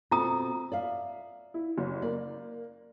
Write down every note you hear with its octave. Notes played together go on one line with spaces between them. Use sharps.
B2 A3 C4 F4 A#5 D#6
D5 E5 F5
E4
F#1
A#3 D5